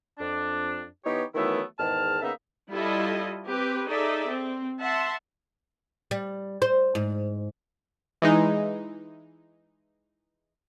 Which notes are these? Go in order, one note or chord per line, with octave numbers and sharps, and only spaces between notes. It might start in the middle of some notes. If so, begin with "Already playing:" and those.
F2 D4
E3 B3 D#4 G4 C#5
D#3 E3 F#3 A3 B3 E4
E2 G#2 D#3 A5 F6
C#3 A#3 B3 D#4 E5
G3 E4 F4 A4 D#5
C4 G4 B4
D#4 G#4 A4 D5 E5
C4
E5 F#5 A5 C6
G3
C5
G#2
E3 G#3 D#4